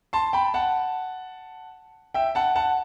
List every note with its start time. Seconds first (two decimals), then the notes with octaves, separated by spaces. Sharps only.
0.13 A5 C6
0.33 G5 B5
0.54 F#5 A5
2.14 E5 G5
2.35 F#5 A5
2.56 F#5 A5